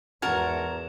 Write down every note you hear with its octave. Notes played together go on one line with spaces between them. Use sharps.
E2 G#2 F#4 A#4 A5 G#6 E7